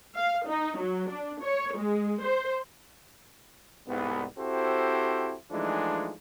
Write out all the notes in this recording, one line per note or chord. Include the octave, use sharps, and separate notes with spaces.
F5
D#4
F#3
D4
C#5
G#3
C5
C2 G#2 B3
C4 E4 F#4 G4 A4 C5
E3 F3 G#3 A3 D4 D#4